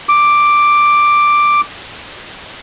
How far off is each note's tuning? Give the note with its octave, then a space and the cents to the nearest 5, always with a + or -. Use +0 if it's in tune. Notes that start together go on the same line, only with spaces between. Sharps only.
D6 +5